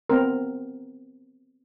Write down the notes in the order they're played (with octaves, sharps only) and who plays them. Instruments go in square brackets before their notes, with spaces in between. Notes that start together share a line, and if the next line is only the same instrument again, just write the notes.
[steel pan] B3 C4 A#4